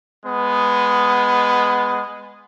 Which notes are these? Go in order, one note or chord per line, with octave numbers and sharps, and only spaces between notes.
G#3 B3